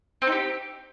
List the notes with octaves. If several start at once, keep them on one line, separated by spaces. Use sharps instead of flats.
C4
D#4
G4